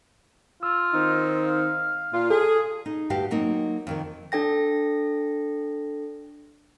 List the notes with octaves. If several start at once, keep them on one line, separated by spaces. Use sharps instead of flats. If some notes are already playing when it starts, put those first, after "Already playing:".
F4 E6
D#3 C4 D#4
F5
A#2 F4
G#4 A4
D#4
D2 G2 F#4 G4 F5
F#3 A#3 C4 D#4
F2 D#3 A#4
D4 A4 G5 A#6